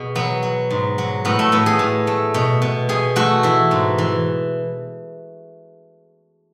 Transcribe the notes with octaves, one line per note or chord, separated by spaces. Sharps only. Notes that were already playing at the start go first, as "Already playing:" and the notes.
Already playing: B2 G#4
F#3 B3
F#3
G#2
F#3
A2 B3
A3
A2 B3
G#4
A2
A3
B2
B2
B2 G#4
A3 F#4
E3 E4
G#2
E3